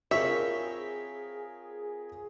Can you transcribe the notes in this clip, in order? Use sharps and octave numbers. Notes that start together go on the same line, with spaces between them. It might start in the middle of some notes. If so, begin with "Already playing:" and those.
C4 F4 G#4 A#4 C#5 E5 B5